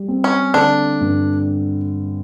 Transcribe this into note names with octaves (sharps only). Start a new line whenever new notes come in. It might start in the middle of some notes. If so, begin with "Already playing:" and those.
Already playing: G3
C4
C#4
D3 D4
G2